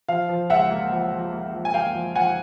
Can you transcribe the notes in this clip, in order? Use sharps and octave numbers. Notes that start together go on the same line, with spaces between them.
F3 F5
F3
C#2 E5 F#5
A#3
F3
F3
A#3
F3
G#5
A#3 F5 G5
F3
F3 F#5 G#5